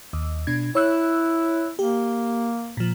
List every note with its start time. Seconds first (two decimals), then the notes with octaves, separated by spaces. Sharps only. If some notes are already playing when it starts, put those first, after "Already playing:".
0.13 D#2
0.47 B2 D4 G#6
0.75 E4 C#5 E6 F#6
1.79 A#3 G4
2.77 A#2 F3